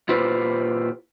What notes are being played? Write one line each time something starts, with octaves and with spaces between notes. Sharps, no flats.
A#2 E4 F4 G4 B4 C5